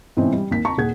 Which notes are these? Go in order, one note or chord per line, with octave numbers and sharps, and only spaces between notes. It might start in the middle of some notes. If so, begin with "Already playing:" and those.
G#2 B2 E3 C4 C#4
G3
G#1 D#2 B6
A5 A#5 C#6
D#1 D#2 G#4 F#5 G#6